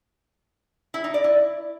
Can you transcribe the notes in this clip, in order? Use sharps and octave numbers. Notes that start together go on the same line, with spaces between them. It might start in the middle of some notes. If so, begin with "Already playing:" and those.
E4
D#4
D5
E4